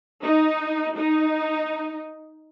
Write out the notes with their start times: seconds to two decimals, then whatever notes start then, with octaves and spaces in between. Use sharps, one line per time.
0.23 D#4
0.97 D#4